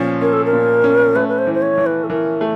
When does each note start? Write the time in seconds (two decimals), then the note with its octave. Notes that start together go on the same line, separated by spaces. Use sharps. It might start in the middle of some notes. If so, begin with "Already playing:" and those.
Already playing: A#2 F3 C#4
0.21 C#4 A#4
0.33 A4
0.45 A#4
0.53 A#2
0.84 C#4
1.15 A3 B4
1.29 B4
1.38 C5
1.47 E3
1.54 C5
1.62 C#5
1.78 E3
1.86 B4
2.04 A4
2.09 E3 A#4
2.41 A3